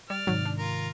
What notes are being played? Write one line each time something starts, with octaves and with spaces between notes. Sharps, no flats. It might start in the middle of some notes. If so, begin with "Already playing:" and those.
G3 D5 F6
G#2 C3 D#3 F#3
D4
F4 A#4